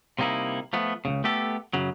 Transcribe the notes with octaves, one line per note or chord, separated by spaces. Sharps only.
C3 G3 A#3 D#4 E4
F3 A3 B3
C#2 G#2 C#3
A3 B3 G4 A4
F#2 C#3 F#3